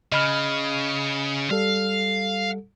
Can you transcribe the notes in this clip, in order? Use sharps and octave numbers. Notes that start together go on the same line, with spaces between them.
C#3 D#5 B5 F6
G3 A4 F5